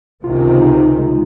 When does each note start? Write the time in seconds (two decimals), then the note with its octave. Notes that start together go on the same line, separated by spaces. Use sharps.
0.24 C#2 C3 D#3 F4
0.62 D#4
0.99 G#3